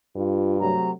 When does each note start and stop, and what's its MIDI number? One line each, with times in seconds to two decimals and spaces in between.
0.16 0.73 43
0.16 0.57 65
0.60 0.90 48
0.60 0.90 54
0.60 0.90 57
0.60 0.91 82